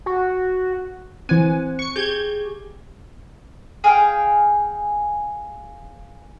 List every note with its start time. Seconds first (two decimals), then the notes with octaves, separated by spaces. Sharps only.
0.06 F#4
1.29 E3 C4 C5 G#5
1.79 C#6 C#7
1.96 G4 G#4 G6 G#6
3.84 G#4 F5 G5